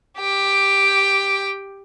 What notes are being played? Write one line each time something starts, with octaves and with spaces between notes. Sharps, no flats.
G4 G5